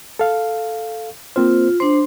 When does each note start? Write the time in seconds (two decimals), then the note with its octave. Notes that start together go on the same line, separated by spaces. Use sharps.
0.19 A4 F5
1.36 A#3 C4 F4 C5
1.80 D4 C5 C6